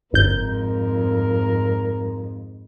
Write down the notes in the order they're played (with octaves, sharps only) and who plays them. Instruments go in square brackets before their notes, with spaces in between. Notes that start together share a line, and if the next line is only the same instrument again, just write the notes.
[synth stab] G1 G6 [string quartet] F2 G#2 [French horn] A#4